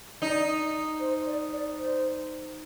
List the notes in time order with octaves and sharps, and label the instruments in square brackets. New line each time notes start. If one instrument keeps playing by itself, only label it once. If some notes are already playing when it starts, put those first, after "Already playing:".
[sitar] D#4 [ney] D5
[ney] C5
D5
D5
C5